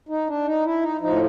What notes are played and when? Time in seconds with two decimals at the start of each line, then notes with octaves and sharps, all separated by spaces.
0.09 D#4
0.27 D4
0.45 D#4
0.65 E4
0.82 D#4
1.01 A2 F3 D#4